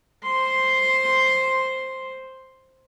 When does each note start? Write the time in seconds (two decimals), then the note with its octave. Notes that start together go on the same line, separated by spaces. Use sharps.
0.23 C5 C6